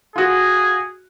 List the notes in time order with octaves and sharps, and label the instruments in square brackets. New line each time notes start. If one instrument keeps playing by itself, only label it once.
[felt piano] F4 F#4 [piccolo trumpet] G#4